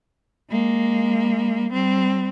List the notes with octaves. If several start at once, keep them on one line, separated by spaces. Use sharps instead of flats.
G#3 A#3
G3 C4